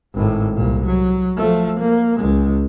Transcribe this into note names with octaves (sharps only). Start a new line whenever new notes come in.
G#1 A2
C2 A#2
F#3
F3 A3
A#3
C#2 G#3